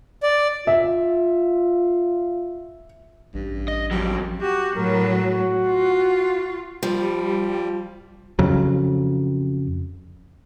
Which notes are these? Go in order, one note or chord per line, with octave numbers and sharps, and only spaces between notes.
D5
F4 E5
A1 G2
D#5
F2 F#3 G3
F#4 G4
A2 F#3 A#4
F#4
F4
F3 G3
F2 C#3 F#3